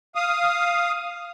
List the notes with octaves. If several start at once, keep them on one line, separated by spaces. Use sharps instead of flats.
F5 D#6